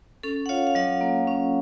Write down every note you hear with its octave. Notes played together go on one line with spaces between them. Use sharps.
C#4 A4
F#5
F4 C#5 F5
F5
F#3 D#5 F#5
A#3
C#4